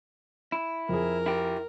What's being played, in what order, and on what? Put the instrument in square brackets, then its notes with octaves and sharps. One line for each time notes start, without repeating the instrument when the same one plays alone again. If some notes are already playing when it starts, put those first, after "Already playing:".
[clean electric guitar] E4
[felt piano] F2 G#4 [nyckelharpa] A#4
[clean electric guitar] E4 G4